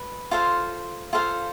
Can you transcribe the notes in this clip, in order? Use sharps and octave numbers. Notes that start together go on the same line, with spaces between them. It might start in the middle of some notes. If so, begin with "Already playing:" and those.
Already playing: B4
F4 A4 C5 F5
F4 A4 C5 F5